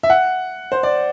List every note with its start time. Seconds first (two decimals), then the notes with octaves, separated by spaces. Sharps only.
0.03 E5
0.10 F#5
0.72 C5
0.83 D5